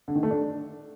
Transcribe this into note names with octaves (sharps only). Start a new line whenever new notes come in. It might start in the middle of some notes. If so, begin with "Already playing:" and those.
D3
D#3
A3
D4